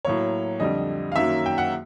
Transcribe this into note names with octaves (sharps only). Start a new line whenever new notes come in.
A2 F#3 A#3 C#5
F2 D3 G3 D#5
F5
F#2 D#3 F#3 A#3 E5
G5
F#5